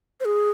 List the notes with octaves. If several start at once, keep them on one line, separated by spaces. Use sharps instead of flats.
C5
G#4